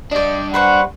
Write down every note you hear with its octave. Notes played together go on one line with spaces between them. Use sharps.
G3 D4 D5 D#5
B4 C5 F#5 C#6